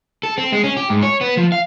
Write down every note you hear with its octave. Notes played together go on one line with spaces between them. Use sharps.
A4
C4
G#3
C#4
G4
G#2
C#5
B3
F3
F5